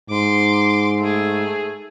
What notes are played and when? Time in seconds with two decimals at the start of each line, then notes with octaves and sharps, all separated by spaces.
0.10 G#2 C6 D6
1.00 A3 G#4